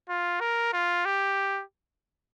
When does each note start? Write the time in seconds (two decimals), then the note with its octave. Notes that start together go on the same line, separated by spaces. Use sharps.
0.09 F4
0.40 A#4
0.73 F4
1.05 G4